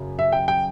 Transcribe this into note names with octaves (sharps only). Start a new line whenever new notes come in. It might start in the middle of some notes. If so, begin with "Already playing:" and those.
Already playing: F#2 C#3
E5
G5
G5